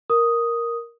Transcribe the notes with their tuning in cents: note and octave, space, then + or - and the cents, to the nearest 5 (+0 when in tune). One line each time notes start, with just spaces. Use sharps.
A#4 +0 D#6 +0